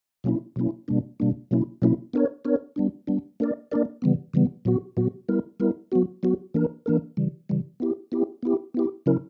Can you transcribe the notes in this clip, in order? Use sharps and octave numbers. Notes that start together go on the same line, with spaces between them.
B2 F#3 A#3 C#4 E4
B2 F#3 A#3 C#4 E4
B2 G3 A#3 D4
B2 G3 A#3 D4
B2 F#3 A#3 C#4 E4
B2 F#3 A#3 C#4 E4
B3 D4 A#4 C#5
B3 D4 A#4 C#5
G3 B3 D4
G3 B3 D4
A#3 D4 A#4 D5
A#3 D4 A#4 D5
C#3 E3 G3 B3
C#3 E3 G3 B3
A#2 F#3 B3 F#4
A#2 F#3 B3 F#4
G3 B3 E4 A#4
G3 B3 E4 A#4
F#3 B3 F#4
F#3 B3 F#4
E3 A#3 D4 A#4
E3 A#3 D4 A#4
C#3 E3 G3
C#3 E3 G3
B3 E4 G4
B3 E4 G4
B3 E4 G4
B3 E4 G4
C#3 F#3 C#4 E4 A#4